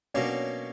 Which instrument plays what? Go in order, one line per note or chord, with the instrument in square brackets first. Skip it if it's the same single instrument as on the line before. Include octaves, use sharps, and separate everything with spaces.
[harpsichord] B2 F#3 A#3 D4 [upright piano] C#4